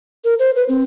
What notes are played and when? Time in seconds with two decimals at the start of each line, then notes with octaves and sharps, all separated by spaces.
0.24 A#4
0.39 C5
0.56 B4
0.69 C4